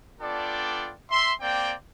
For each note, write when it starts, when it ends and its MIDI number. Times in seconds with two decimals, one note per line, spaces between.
0.21 0.93 59
0.21 0.93 62
0.21 0.93 65
0.21 0.93 69
0.21 0.93 74
0.21 0.93 79
1.10 1.32 76
1.10 1.32 84
1.41 1.74 58
1.41 1.74 60
1.41 1.74 74
1.41 1.74 79